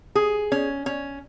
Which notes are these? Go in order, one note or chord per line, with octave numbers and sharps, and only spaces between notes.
G#4
C#4
C#4